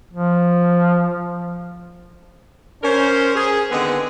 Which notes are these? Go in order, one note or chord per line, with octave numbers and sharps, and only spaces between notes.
F3
C#4 A#4 C5
G#4
D3 D#3 G#3 B3 C4 G#4